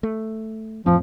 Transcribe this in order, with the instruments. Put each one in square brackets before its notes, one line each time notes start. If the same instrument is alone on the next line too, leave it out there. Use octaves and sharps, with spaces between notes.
[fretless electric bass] A3
[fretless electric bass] F2 A2 C4 [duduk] F3